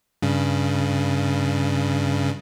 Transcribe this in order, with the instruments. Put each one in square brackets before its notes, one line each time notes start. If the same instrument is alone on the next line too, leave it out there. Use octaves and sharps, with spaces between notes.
[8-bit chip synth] G2 C#3